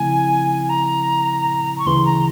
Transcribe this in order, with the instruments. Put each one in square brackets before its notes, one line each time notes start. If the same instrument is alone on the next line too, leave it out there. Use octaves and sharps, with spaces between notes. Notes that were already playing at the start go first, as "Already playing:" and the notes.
Already playing: [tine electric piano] C#3 F3 A3 C4 E4 [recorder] G#5
[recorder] A#5
C#6
[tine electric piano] D2 C#3 E3 [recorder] C6
[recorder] A#5